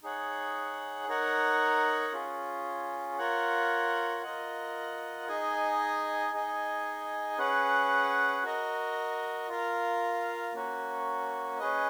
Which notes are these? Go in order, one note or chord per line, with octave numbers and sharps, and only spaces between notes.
D#4 G#4 C#5 F#5
D#4 A#4 C#5 F#5
C#4 F4 G#4
F4 A#4 C#5 F#5
F4 A#4 D#5 F#5
D#4 G#4 D#5 G#5
D#4 G#4 D#5 G#5
C#4 G#4 B4 F#5
F#4 A#4 D#5
F4 A#4 F5
A#3 C#4 F#4
C#4 G#4 B4 D#5